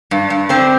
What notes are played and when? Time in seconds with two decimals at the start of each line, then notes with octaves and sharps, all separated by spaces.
0.11 G2
0.30 G2
0.49 D3 C4